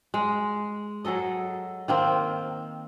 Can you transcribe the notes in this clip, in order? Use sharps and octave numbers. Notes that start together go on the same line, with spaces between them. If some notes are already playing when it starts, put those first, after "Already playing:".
G#3
F#3 G#4 A4 D#5
D#3 A#3 C4